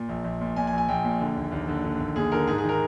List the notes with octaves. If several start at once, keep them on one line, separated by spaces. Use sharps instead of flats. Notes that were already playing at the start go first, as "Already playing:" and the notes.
Already playing: A#2
A#1
A#1
A#2
A#2 G#5
G#5
A#1
G#5
A#1 G5
A#2
D3
D#2
D#2
D3
D3
D#2
D#2 G#4
D3 A#4
G#2 G#4
G#4
D#3
A#4